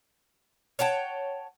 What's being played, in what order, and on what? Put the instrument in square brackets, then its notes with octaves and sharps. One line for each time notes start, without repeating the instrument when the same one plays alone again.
[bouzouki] C#5 F#5 G5 A5